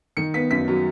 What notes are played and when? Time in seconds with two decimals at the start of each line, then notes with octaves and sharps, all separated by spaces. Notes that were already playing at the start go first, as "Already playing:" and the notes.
0.17 D#3 C#7
0.34 B3 B6
0.51 F#2 B6
0.68 F#3